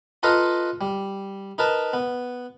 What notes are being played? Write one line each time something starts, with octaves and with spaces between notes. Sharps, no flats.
F4 A4 B4 D#5 F5 A#5
G3
D#4 A#4 B4 A5
B3